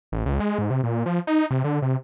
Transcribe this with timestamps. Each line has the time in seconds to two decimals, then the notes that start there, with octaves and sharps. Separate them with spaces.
0.12 A1
0.26 C#2
0.40 G#3
0.58 G#2
0.70 C3
0.83 A#2
1.06 F3
1.27 D#4
1.50 C3
1.64 D3
1.82 C3